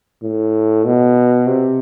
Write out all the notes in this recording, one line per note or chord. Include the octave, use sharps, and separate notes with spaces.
A2
B2
C3